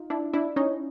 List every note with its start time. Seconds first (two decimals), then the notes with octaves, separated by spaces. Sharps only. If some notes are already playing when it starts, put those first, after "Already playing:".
Already playing: D#4 F4
0.10 D4 E4
0.33 D4 E4
0.56 C#4 D#4